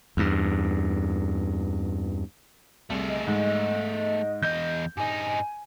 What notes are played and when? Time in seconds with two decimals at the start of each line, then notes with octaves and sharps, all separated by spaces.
0.17 E2 G2
2.90 C2 A3 G#4
3.09 D#5
3.27 G#2
4.42 E2 D#5 G6
4.97 G2 D#4 G#5